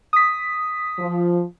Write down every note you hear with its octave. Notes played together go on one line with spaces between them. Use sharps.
D#6 B6
F3